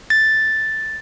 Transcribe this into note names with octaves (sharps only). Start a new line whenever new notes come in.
A6